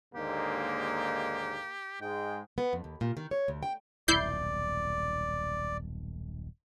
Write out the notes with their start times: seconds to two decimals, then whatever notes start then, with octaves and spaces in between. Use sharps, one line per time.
0.15 D#2 G#2 D3 A#3 G4
2.01 G#2 G#3 G5
2.58 B3
2.73 F2
2.84 D#2
3.01 A#2
3.17 D#3
3.31 C#5
3.48 D2
3.63 G5
4.08 D#1 B1 E4 D5 G6 C7